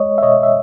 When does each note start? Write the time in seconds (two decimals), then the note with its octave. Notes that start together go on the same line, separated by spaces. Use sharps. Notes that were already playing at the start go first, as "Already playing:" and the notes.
Already playing: G#3 C#5 D#5
0.18 E5
0.23 B2 C#5 D#5
0.43 E5